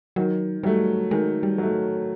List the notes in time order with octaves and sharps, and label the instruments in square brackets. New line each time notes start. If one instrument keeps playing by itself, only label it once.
[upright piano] D#3 [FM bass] F#3
[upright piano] F#3 A3 [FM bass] G3
[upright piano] D#3 [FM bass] G#3
[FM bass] G3
[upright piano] F#3 A3